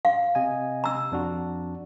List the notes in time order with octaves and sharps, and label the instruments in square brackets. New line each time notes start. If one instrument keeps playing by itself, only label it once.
[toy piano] F5
[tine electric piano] C3 D#5 G#5
[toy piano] A#5 E6
[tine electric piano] F2 D4 F#4